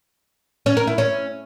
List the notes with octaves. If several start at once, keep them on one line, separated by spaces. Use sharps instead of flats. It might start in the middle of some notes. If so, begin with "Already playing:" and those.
C#4
A#4
E4
C#4